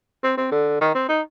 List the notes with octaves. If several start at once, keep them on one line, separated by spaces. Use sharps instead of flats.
C4
C4
D3
D#3
C4
D#4